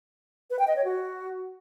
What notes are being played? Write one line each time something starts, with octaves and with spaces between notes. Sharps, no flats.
B4
G5
D#5
C#5
F#4